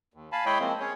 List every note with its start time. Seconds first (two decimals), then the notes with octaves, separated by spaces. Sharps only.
0.14 D#2
0.32 F5 G#5 A5 B5
0.46 G#3 E4 C#5 D#5 G5 B5
0.60 F3 G#3 A#3 C4
0.80 C#4 G#4 C#5